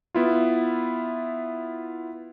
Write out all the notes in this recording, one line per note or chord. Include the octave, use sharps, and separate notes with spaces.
B3 E4 F4